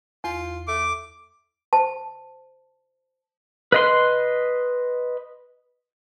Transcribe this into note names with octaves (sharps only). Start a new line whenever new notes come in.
E2 F4
A3 D6
C5 A5
B4 D#5 C6